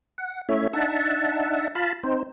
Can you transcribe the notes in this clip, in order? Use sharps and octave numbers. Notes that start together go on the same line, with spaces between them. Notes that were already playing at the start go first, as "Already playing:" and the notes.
F#5
A3 C#4 E4 C#5 E5
D4 D#4 E5 F#5 A5
F4 F5 A5 B5
C4 D#4 C5